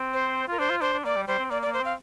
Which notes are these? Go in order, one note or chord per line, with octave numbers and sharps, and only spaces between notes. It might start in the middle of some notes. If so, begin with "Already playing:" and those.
Already playing: C4
C5
F4 A#4
D4 C5
F4
D4 C5
D4
A#3 D5
G3
G3 C5
C4
A#3 D5
D5
A#3
C5
C4 F5